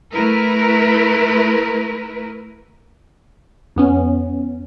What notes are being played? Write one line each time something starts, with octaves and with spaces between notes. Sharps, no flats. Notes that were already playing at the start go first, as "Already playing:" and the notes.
A3 E4 A#4 B4
F2 B3 C#4